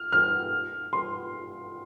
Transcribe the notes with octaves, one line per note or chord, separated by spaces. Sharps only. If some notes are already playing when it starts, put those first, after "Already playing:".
Already playing: F6
F6
C6